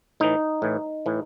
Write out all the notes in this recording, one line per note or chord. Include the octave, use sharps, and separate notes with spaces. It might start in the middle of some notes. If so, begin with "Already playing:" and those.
A2 E3 D#4
A2 E3
A2 E3